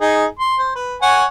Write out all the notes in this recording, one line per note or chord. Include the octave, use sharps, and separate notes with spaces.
D#4 G#4
C6
C5
B4
C#5 F#5 G#5